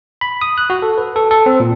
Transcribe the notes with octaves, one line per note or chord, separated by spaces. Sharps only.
B5
D#6
F#6
F#4
A4
B4
A4
A4
C4
A#2